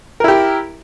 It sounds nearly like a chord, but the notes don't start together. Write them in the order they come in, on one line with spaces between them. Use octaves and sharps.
A#4 E4 G4